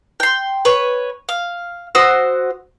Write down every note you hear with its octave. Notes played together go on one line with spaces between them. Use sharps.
G5 C6
B4 C#5
F5
F#4 C5 D#6 E6